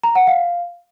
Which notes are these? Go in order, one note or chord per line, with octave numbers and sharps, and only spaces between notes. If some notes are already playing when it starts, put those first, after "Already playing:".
A#5
F#5
F5